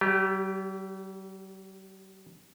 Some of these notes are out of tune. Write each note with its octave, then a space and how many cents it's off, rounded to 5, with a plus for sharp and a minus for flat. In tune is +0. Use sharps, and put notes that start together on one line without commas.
G3 -45 G4 +10